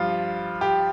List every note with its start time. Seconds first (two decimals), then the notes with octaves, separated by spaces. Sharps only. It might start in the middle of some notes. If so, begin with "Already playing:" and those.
Already playing: G2 F3 F4
0.61 G4